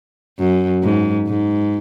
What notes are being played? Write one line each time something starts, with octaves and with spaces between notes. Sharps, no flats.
F#2
G#2
G#2